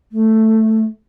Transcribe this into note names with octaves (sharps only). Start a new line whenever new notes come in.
A3